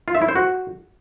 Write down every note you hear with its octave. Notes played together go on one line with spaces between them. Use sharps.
F4
E5
E4
C5
F#4